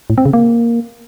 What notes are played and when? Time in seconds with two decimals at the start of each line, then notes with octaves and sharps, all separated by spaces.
0.10 A2
0.18 C4
0.26 C#3
0.33 A#3